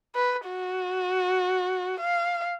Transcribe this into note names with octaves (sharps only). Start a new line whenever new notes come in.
B4
F#4
F5